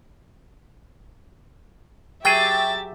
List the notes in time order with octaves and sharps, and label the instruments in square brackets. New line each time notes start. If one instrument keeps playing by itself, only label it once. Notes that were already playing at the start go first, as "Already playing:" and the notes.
[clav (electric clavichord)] F#3 G#4 [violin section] G4 E5 A6 [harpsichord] G5